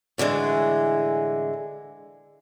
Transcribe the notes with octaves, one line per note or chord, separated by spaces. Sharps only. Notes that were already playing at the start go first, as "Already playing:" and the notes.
A2 D3 E3 G#3